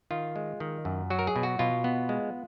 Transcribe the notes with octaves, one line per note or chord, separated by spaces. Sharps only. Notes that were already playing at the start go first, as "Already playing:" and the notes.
D#3 F4
G#3
D#3
F#2
F#3 F#4
A#4
G#4
B2
F#4
B2 F4
B3
G#3